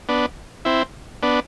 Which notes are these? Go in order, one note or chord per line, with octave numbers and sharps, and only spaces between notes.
B3 D4
C4 E4
B3 D4